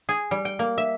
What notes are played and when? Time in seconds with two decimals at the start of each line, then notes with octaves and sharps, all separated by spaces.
0.09 G#4
0.31 G3
0.45 G5
0.59 A#3
0.78 E5